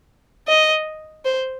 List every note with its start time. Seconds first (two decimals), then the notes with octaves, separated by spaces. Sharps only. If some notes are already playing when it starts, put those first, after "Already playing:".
0.48 D#5
1.25 C5